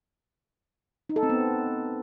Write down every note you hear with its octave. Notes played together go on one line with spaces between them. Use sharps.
D#4
A4
C4
B3